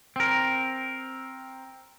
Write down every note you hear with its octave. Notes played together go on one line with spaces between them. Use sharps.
C4 A#4